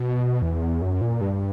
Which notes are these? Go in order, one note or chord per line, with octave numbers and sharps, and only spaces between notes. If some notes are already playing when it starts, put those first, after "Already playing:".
Already playing: B2
E2
F#2
A#2
G2